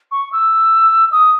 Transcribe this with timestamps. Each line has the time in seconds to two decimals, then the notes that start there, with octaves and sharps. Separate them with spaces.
0.11 C#6
0.32 E6
1.12 D#6